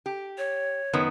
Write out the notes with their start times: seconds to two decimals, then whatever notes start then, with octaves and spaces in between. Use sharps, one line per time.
0.06 G4
0.38 C#5
0.93 F#2 D#3 B3